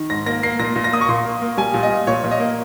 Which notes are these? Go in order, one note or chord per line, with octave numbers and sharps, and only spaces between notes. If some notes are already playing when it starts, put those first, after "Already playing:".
Already playing: D#3
G#2 A#6
A#3 A#6
A#3 C7
A#2 A#6
A#2
A#6
A#3 D#6
C#6
A#2 C6
A#3
A#3
G3 G#5
A#2
D#5
A#2
A#2 C#5
A#2
D#5
A#3